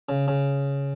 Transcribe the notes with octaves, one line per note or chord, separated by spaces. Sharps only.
C#3
C#3